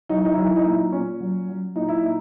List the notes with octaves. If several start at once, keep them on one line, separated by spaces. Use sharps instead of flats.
F#3 D#4
E4
D#4
E4
F#3 D#4
E4
D#4
A#2 E4
D#4
A#2 C#4
F#3
F#3
A#2 D#4
E4
A#2 D#4